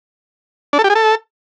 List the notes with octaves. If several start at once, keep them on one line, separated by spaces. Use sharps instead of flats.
D4
A4
G4
G#4
A4